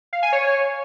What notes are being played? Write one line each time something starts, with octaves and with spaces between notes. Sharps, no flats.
F5
G#5
C#5